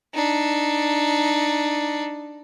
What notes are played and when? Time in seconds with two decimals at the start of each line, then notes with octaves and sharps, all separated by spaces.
0.15 D4 D#4